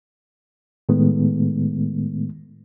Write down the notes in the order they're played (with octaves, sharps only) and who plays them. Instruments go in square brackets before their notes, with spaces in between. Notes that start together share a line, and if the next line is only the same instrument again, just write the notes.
[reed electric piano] A2 D#3 G#3 A3 B3